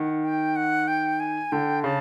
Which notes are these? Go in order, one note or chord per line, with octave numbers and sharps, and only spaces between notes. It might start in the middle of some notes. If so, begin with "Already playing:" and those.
Already playing: D#3 F#5
G5
F#5
G5
G#5
D3 G5
C#3 A5